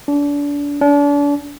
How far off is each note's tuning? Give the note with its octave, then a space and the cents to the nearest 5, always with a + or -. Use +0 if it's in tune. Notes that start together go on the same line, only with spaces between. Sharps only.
D4 -30
D4 -35